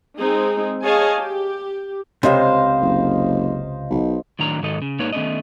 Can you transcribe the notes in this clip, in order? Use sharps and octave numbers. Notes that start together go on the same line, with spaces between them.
G#3 C4 D#4 G#4
G#4 C#5 D#5 F5 G#5 A5
G4
C#2 C3 C5 D#5 F5
F#1
B1
A2 D#3 F#3 D4 A#5
G#2 D#3 F#3 D#4 A4 D#5
C#3
G#2 A#3 D4 D#4 B4 C#5
D#3 A3 B3 C#4 D4 D#5